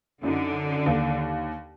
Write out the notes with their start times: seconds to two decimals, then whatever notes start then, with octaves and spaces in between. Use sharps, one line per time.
0.23 F#2 D3 D#4
0.86 D#2